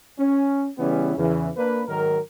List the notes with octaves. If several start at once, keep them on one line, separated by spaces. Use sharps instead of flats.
C#4
C#3 E3 G3 B3 C#4 E4
E2 C#3 E3
A#3 D4 B4
G#2 D#3 F#3 A#4